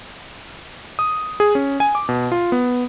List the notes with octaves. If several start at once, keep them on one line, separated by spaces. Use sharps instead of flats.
D#6
G#4
C#4
G#5
D6
B2
F4
B3